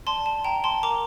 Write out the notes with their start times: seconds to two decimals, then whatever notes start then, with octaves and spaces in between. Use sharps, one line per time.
0.07 D5 A5 C6
0.26 A5
0.44 G5 A#5
0.64 A5 C6
0.83 A#4 A#5 D6